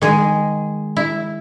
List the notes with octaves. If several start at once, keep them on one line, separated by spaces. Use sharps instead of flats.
D#3 G#3 G#4
E4